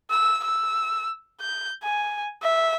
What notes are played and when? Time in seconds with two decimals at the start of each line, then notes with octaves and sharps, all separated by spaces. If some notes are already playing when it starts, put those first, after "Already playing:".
0.11 E6
0.44 E6
1.40 G6
1.83 G#5
2.42 E5